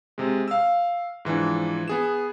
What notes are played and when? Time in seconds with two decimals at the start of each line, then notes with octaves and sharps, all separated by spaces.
0.18 C3 G#3
0.48 F5 E6
1.25 G#2 E3 F3 D4
1.88 B3 G#4 E7